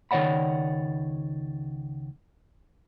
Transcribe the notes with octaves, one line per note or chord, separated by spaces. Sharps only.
C#2 D#3 C#5 D5 F#5 B5